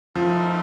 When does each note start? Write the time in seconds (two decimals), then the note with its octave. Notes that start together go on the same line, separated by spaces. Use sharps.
0.15 A2 F3 A3 C4 D#4 A#4